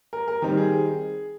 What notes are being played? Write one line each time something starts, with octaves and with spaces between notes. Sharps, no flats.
A#4
A#4
D#3 G3 C4 D#4 G4
G#4